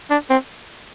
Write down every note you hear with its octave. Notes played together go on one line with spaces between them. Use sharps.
D4
C4